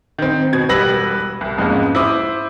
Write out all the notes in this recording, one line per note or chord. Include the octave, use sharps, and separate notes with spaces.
D#3 C4
B2 G#6
E1 G3 B4 E6 A#6 F#7
C2
F2 G#2 G#3 A#3 B3 C#4
E4 C5 D6 D#6